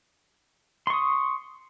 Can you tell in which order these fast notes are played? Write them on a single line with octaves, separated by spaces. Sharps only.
C6 C#6 D#6